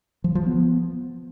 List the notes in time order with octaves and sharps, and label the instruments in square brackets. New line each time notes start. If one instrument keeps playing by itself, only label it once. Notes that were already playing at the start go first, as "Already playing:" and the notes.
[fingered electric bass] F3
F3
B3